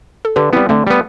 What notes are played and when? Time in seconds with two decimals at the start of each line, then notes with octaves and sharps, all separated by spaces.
0.25 A4
0.36 D3 G4 B4
0.53 G3 B3 C4 E4
0.69 D3 A3 C4
0.87 G3 B3